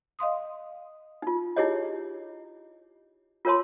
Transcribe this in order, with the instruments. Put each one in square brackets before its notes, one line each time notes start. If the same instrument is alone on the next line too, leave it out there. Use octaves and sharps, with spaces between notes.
[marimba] D#5 F5 C6 D#6
[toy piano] D#4 F4
D#4 E4 G4 G#4 C#5 D#5
F4 A#4 C#5 A5 C6